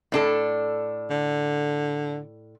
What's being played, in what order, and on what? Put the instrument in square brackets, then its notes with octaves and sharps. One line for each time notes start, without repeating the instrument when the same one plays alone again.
[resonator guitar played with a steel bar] A2 D4 A4
[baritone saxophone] D3